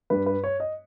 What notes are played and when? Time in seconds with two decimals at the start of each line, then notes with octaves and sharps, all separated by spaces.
0.10 G2 G3 B4
0.26 B4
0.44 C#5
0.60 D#5